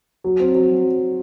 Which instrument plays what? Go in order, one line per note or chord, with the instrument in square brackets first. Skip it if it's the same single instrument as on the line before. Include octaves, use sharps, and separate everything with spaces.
[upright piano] F#3
C4
F#3